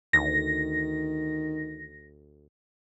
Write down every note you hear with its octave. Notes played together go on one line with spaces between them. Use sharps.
D2 D#3 A#6